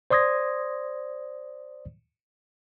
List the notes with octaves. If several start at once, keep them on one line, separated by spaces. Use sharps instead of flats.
C5 D5 C6 D#6 G#6 A#6